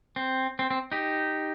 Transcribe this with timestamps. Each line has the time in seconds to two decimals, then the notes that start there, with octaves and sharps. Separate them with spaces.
0.16 C4
0.59 C4
0.70 C4
0.92 D#4 G4